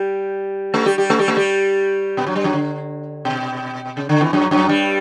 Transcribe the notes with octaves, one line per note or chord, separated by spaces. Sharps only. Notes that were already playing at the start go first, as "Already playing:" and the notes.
Already playing: G3 G4
A3 A4
G3 G4
G3 G4
A3 A4
G3 G4
A3 A4
G3 G4
B2 B3
F#2 F#3
G2 G3
F#2 F#3
D3
B2
C#3
D3
E2 E3
F#2 F#3
F#2 F#3
G2 G3